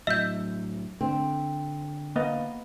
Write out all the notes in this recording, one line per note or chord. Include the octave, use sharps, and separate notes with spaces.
A2 F#3 D#5 E5 G6
D3 C4
A#3 B3 D#5